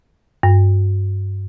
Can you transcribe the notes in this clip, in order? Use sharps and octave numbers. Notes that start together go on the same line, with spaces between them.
G2